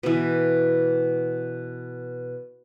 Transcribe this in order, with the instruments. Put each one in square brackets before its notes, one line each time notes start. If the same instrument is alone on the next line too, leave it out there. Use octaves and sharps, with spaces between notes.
[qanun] B2 E3